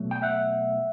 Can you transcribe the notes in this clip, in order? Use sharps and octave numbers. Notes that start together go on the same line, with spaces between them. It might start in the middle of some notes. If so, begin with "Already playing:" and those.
Already playing: B2 F#3 A3
G5
E5 F#5